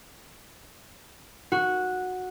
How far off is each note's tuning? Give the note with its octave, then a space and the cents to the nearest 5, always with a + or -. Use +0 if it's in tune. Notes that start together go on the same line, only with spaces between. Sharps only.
F#4 -10